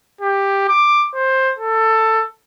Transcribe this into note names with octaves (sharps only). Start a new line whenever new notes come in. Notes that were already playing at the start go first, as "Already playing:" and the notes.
G4
D6
C5
A4